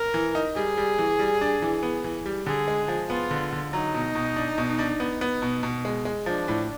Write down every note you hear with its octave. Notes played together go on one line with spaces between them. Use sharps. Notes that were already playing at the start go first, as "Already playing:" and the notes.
Already playing: A#4
E3
D#4
G3 G#4
G3
E3
G3
D4
E3
B3
E3
G3
D3 G#4
G#3
F3
B3 F4
D3
D3
F#3 D#4
B2
B2
D4
B2
D4
B3
B3
B2
B2
G#3
G#3
F3 D4
A2